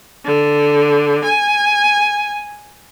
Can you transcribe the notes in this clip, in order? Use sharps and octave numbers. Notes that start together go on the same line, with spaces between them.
D3
G#5